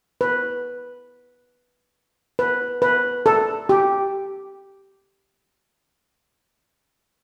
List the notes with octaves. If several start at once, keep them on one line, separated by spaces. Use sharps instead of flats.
B4
B4
B4
A4
G4